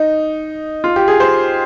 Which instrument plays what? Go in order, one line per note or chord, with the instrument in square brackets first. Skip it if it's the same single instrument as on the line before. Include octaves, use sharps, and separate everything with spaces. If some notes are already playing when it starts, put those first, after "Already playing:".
Already playing: [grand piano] D#4
F4
G4
G#4
C5